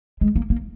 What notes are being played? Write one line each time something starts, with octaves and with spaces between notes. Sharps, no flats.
G#3
A#3
A#3